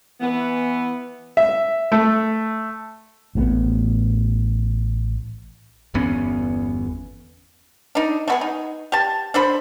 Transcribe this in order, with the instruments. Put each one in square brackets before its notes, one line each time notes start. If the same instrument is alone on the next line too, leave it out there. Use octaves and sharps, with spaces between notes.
[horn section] E3 B3
[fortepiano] E5
A3
[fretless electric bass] A1 A2 C3 B3
[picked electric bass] G1 E2 B3 C#4
[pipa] D4 D#4
A3 B3 G#4
D#4
G4 A5
D4 A4 C5 B5